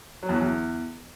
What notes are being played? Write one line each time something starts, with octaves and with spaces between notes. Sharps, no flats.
F#3
E2
F#3
E2